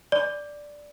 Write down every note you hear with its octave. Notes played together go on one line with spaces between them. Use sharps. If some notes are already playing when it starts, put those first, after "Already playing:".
D5